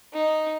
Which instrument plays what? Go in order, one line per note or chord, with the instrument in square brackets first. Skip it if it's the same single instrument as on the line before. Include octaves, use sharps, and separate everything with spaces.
[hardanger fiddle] D#4